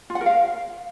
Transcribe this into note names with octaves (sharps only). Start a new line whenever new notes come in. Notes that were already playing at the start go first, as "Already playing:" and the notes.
F4
F#5
A#4
F5